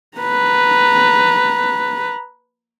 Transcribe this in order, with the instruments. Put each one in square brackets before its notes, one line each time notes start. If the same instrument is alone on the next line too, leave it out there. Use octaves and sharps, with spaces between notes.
[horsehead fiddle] B4 A#5